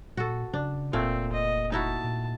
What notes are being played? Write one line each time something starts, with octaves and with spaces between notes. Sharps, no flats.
A#2 F#4 A4
C#3 D4
F1 A#2 A3 C4
D#5
D#4 E4 F#4 A5
A#2